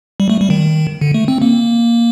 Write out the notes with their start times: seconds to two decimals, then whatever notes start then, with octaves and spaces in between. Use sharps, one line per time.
0.20 G3
0.30 A3
0.41 G3
0.50 D#3
1.01 D3
1.14 A3
1.28 C4
1.42 A#3